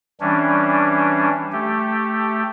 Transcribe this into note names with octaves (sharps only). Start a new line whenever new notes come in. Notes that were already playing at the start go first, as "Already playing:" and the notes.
E3 G3 C#4 D4
A3 G4